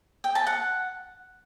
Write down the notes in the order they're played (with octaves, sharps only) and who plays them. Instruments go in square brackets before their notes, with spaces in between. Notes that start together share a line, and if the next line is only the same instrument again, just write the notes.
[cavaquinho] G5
A5
F#5